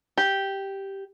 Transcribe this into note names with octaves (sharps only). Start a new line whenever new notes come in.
G4